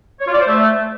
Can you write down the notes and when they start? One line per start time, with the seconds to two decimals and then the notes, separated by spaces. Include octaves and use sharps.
0.20 C#5
0.27 F4
0.34 D5
0.40 C5
0.47 A3